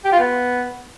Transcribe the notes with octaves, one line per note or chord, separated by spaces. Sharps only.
G4
F4
B3